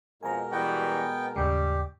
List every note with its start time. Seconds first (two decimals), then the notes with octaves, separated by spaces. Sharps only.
0.23 F2 B2 G#3 A#4 G#5 A#5
0.52 E3 G3 B3 F#4 G5
1.36 D#2 G#2 C#3 G3 G4